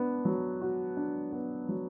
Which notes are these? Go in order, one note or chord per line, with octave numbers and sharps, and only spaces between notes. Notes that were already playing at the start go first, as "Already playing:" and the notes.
Already playing: B3 D4
F#3
F#4
D4
B3
F#3